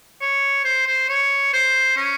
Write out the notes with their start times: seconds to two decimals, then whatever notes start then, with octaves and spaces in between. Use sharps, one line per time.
0.21 C#5
0.65 C5
0.87 C5
1.09 C#5
1.53 C5
1.97 C#4